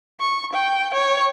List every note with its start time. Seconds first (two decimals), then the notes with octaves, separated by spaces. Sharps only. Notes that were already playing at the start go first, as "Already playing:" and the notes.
0.20 C#6
0.53 G5
0.94 C#5